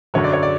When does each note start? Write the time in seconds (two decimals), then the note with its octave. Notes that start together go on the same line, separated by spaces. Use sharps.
0.14 F#2 D3 F#3 C#5
0.24 D5
0.33 C#5
0.43 D5